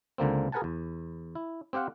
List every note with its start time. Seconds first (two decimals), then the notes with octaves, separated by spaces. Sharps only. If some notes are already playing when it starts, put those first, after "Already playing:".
0.18 C#2 D3 A#3 C4
0.52 G#4 A#4 B4 F#5 G#5 A5
0.64 E2
1.35 E4
1.73 C4 G4 C5 F5 F#5